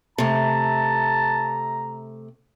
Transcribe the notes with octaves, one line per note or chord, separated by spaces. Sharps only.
C3 A3 A5 A#5